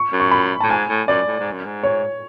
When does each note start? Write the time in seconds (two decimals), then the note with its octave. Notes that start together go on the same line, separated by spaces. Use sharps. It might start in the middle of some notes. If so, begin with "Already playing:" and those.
Already playing: C#6
0.13 F#2
0.20 C#6
0.31 B5
0.61 A2 A5
0.70 G#2 G#5
0.89 A2
1.08 F#2 D5
1.27 A2
1.40 G#2
1.52 F#2
1.65 G#2
1.83 C#5